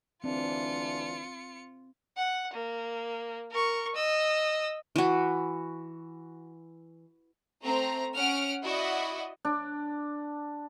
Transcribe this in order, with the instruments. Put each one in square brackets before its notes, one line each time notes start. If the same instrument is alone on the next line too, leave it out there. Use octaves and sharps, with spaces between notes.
[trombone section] D2 E3 D4 [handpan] C4 [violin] F4 C#7
[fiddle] F#5
A#3
A#4 C#6
D#5 E6
[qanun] E3 F#4
[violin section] A3 C4 A#5
C#4 F#5 F6 D7
E4 F#4 D5 D#5
[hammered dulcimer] D4